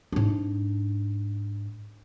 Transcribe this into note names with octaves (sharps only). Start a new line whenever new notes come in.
G#2 D4